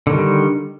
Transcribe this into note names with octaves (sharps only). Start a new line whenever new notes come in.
D3 D#3 G3